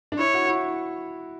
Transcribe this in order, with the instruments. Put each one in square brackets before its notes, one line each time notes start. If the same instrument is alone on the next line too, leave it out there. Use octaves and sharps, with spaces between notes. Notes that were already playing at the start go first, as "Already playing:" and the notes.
[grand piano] D4
[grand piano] E4 [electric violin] C#5
[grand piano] F#4
F#4
E4